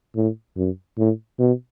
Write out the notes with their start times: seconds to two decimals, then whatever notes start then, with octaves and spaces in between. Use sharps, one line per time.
0.16 A2
0.57 F#2
0.98 A2
1.39 B2